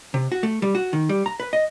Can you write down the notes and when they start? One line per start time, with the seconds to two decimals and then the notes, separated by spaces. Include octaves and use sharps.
0.14 C3
0.32 F#4
0.43 A3
0.62 G3
0.75 F#4
0.93 D#3
1.09 G3
1.26 A#5
1.40 B4
1.53 D#5